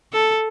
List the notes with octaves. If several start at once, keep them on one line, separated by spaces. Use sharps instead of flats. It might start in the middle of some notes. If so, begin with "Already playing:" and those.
A4